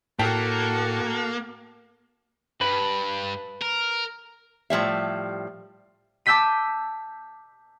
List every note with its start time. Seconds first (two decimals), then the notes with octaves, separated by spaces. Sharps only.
0.19 A2 A#3 F#4 A4 G5 A5 B6
2.61 G2 B4
3.61 A#4
4.70 A2 F3 G3 E5
6.26 A5 D6 E6 G6 B6 D#7